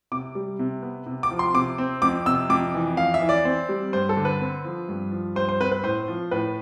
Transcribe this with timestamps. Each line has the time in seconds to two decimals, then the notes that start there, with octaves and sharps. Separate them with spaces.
0.12 C3 D6
0.35 G3
0.59 C3
0.82 B3
1.06 C3
1.23 D6
1.31 F3
1.39 C6
1.55 C3 D6
1.78 C4
2.02 F2 D6
2.26 C3 E6
2.49 F2 D6
2.74 E3
2.97 F2 F5
3.14 E5
3.21 E3
3.29 D5
3.45 C4
3.69 G3
3.93 G2 C5
4.09 A4
4.17 D3
4.25 B4
4.40 C4
4.65 F3
4.89 G2
5.12 F3
5.36 G2 C5
5.49 C5
5.60 C4 B4
5.72 B4
5.83 A2 C5
6.08 F3
6.31 A2 B4